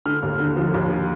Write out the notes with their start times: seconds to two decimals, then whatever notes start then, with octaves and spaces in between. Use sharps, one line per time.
0.06 D3 F6
0.23 D#2
0.40 D3
0.56 F3
0.74 D#2